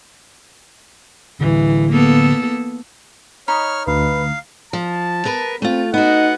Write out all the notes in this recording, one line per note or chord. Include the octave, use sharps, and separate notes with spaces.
A2 D3 E3
A#3 B3 A4
D#4 C#5 D#5 B5 F6
D2 B4 F5
F3 A5
B3 A#4 B4
A3 C4 F4
B3 D#4 F#4 F#5